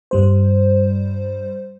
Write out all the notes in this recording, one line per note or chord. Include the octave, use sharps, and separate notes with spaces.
G2 G3 C5